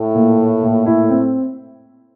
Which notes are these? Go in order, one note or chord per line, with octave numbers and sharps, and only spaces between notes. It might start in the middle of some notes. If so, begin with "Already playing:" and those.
Already playing: A2
A#2
A#2
A#2
E4
C4